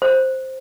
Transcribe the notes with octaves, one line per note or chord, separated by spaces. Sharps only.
C5